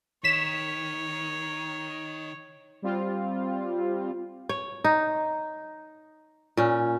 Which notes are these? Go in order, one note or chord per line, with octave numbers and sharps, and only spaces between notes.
D#3 C#5 B6 E7
G3 C4 F4
C#5
D#4
A#2 C#4